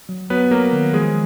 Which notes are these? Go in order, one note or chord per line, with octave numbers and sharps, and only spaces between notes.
F#3
F#3 B3 B4
F#3 A#3 A#4
D#3
F3 G#3 G#4